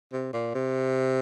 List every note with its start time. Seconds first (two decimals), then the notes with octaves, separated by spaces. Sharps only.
0.13 C3
0.33 A#2
0.55 C3